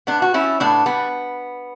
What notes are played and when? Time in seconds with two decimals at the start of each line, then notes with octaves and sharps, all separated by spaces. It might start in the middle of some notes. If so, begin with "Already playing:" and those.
0.07 A2 B3 D4
0.22 F#4
0.34 G3 C#4 E4
0.60 A2 B3 D4
0.86 G3 B3